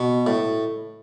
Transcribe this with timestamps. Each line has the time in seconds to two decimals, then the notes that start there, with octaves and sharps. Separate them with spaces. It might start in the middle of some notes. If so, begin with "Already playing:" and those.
Already playing: B2
0.27 A2